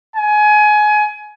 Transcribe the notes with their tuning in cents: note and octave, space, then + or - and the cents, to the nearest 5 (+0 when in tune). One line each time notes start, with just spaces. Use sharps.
G#5 +25